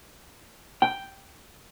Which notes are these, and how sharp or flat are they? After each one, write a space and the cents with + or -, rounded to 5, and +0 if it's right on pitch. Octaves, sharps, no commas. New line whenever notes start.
G5 +0